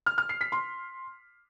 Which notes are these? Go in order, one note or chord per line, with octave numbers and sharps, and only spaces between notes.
F6
F6
C7
B6
C6